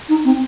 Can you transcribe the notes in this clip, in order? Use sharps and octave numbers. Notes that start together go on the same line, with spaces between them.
D#4
C4